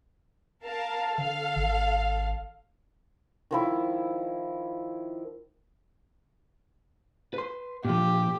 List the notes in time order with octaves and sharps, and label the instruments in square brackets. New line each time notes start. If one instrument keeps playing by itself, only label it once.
[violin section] A#4 F5 A5
[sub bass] D3 [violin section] A4 F5
[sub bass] G#1
[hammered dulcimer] D#3 F3 E4
[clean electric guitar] B4 C6
[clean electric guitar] A#2 F3 [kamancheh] G4